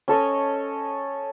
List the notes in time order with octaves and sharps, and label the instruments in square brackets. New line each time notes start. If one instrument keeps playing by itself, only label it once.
[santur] C#4 A4 C#5 D#5